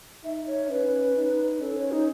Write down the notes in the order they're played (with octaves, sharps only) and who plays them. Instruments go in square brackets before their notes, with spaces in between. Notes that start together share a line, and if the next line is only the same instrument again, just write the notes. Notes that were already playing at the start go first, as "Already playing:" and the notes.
[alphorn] D#4 [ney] E5
[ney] C#5
[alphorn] C#4 [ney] B4
[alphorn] D#4
[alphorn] C#4 [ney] A4
[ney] C#5
D#4